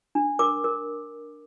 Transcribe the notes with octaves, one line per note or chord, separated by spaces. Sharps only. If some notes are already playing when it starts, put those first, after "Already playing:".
D4
A#4 D6
A#4